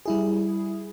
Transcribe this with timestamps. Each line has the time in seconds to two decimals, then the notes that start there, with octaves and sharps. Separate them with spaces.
0.06 G3 E4 G#4